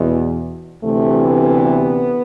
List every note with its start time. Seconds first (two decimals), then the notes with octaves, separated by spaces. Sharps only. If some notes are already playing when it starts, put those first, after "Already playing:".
Already playing: E2 B2
0.82 D2 C3 E3 A3
1.21 B3